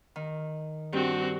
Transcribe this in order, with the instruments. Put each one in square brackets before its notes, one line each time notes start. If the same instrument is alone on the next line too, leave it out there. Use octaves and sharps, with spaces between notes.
[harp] D#3
[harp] G2 [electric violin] C4 F#4